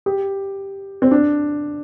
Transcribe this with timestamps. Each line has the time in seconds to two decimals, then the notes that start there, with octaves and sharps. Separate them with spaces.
0.06 G4
1.02 C4
1.11 D4